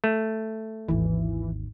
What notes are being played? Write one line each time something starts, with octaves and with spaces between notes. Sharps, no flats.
A3
G#1 D#2 E3